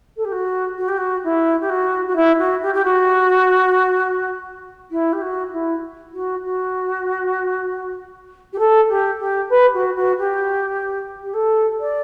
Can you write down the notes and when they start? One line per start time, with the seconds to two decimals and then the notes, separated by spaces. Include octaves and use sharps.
0.16 A4
0.24 G4
0.32 F#4
0.77 F#4
0.88 G4
0.97 F#4
1.24 E4
1.60 G4
1.69 F#4
2.07 F#4
2.16 E4
2.38 F#4
2.62 G4
2.73 G4
2.84 F#4
4.91 E4
5.12 G4
5.21 F#4
5.52 E4
6.14 F#4
6.44 F#4
8.52 G4
8.58 A4
8.89 G4
9.19 G4
9.49 B4
9.73 F#4
9.95 F#4
10.18 G4
11.22 G4
11.33 A4
11.80 D5